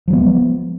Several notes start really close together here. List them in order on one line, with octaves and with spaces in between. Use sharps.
F3 F#3 B3 G#3